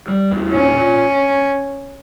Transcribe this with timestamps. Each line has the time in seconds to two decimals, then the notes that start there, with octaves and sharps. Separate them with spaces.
0.08 G3
0.31 E2
0.53 A#2 C#4
0.76 A#2